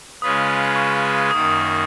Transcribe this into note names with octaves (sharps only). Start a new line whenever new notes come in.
C#3 G#3 C#4 F4 B4 D#6
C#6
F#2 D#3 A#3 D#6